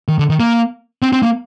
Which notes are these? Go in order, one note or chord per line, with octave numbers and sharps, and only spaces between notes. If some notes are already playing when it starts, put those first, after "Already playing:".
D#3
D3
D#3
A#3
C4
C4
A#3